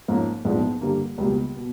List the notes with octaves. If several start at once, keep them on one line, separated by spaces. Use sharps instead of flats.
G#2 F3 A#3 C#4
A#1 G#2 F3 G#3 B3
G2 D3 G3 A#3
C#2 B2 G3 A#3
B2